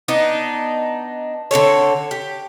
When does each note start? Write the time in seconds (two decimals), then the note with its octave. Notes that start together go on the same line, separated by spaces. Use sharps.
0.08 B3 D4 D#4
1.51 D3 C4 A4 C#5
2.11 G4